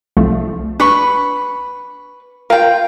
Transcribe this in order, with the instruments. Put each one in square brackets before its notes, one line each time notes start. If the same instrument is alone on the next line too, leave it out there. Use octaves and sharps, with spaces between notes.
[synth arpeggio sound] C2 F3 A3
[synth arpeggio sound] D4 [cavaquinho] B4 B5 C#6
[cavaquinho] F4 G5 [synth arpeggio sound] A#4